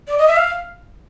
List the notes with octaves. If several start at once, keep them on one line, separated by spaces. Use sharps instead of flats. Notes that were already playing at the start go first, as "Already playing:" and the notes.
D5
D#5
E5
F5